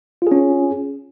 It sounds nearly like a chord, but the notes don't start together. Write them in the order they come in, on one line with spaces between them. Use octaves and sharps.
F4 G#4 C#4